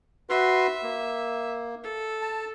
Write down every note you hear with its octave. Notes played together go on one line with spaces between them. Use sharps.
F#4 B4 E5 C6
A#3
A4
A5